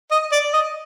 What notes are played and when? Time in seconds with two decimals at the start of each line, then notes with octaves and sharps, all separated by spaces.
0.11 D#5
0.32 D5
0.54 D#5